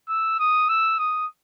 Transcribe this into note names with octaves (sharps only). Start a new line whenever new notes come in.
E6
D#6
E6
D#6